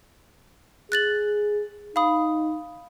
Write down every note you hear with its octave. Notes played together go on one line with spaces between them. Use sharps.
G#4 F#6 A6 F#7
D#4 F5 B5 D#6